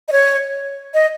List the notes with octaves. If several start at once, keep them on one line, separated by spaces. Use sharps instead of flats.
D#5
C#5
D#5